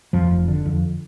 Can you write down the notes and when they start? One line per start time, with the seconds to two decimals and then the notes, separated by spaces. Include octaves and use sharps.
0.13 F2 F3
0.31 F1
0.48 D3
0.66 F2